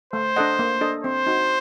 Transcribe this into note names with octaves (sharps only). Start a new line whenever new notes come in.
A3 C5
D4 A4 D#5 F#5
A#3
D4 A4 D#5
C4 C5
D#4 F#4